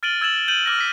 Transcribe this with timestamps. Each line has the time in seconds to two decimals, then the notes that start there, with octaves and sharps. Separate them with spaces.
0.03 F6 A6 D7 D#7 F#7 G7
0.21 E6 G#6 A6 E7 F#7
0.36 E7
0.48 G6 D#7 F#7
0.66 D6 F6 A#6
0.79 E6 B6